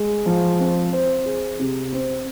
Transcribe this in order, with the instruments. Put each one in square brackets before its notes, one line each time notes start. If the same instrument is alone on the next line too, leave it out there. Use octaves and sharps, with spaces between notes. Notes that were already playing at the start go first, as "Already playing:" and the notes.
Already playing: [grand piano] G#3
F3
C4
C5
G#4
C3
C4